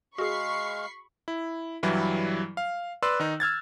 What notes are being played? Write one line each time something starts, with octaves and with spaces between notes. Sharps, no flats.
G#3 F#4 G#4 F5 B5 C#6 C7
E4
G2 E3 F#3 G3 E4
F5
B4 D5 C6 E6 F#6
D#3 D#4
E6 F6 G#6 A6